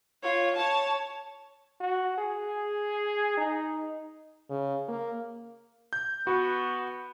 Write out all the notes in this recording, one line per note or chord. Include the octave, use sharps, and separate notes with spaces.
F4 C#5
C#5 A5
F#4
G#4
D#4
C#3
A#3
G6
B3 F#4